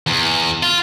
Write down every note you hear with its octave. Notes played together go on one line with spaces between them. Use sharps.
E2
F4